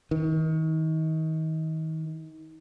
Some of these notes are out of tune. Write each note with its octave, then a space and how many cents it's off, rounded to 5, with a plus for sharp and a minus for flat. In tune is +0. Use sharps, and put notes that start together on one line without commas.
D#3 +35